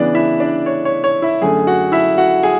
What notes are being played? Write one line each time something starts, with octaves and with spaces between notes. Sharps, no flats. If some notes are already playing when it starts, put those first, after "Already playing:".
Already playing: C#3 E3 B3 D4 D5
E4 E5
D4 D5
C#5
C#5
C#5
E4 E5
F#2 D3 A3 G#4 G#5
F#4 F#5
E4 E5
F#4 F#5
G#4 G#5